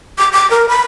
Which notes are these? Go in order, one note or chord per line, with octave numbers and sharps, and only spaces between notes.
D6
D6
A#4
B5